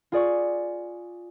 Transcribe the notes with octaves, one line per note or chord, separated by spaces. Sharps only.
F4 G#4 D5 C#6